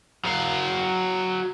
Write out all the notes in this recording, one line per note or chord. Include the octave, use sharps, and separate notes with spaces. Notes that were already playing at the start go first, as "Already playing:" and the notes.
F#3 F5